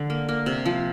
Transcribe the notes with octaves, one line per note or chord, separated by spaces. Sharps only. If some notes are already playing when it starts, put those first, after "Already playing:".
Already playing: D3
A#3
A#3
C3
F3